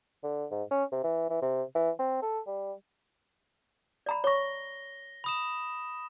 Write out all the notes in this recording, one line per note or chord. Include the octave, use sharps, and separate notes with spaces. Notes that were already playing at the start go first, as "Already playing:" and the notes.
D3
G#2
C#4
C3
E3
E3
C3
E3
C4
A4
G3
D5 A#5 B5
C#5 C#6 A#6 G7
B5 D#6 E7